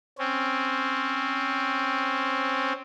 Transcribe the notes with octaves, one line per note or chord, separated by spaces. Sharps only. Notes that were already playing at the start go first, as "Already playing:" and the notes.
C4 C#4